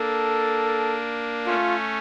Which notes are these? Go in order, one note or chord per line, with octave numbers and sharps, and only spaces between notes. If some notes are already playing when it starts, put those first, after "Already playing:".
Already playing: A#3 D4 A4
A3 C#4 F4